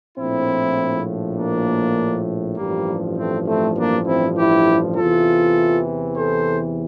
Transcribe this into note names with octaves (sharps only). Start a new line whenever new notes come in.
A#1 A2 F3 C4 E4
A#3 D4
A1 G2 F3 G3 A#3
A3 C4
A3 C4
A#3 D4
C4 E4
E4 G4
E2 C3 E3 F4 A4
A4 C5